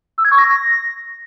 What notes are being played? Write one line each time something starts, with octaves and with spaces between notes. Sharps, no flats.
E6
G#6
C#6
A#6